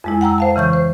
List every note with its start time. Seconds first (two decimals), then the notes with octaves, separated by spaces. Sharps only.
0.04 F2 G#3 E4
0.21 F#5 G5 A#5 E6
0.38 C5 F5 A5
0.56 C#3 E3 C#6 G6
0.73 C5